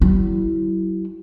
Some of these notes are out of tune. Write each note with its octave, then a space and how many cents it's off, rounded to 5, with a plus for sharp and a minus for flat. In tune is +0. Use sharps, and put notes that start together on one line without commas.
F#3 +40 E4 +0